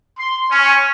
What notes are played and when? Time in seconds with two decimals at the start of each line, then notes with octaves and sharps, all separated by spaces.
0.18 C6
0.51 C#4